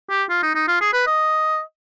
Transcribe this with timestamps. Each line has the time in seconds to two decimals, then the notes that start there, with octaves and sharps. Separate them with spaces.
0.10 G4
0.30 F4
0.43 D#4
0.55 D#4
0.68 F4
0.81 G#4
0.93 B4
1.07 D#5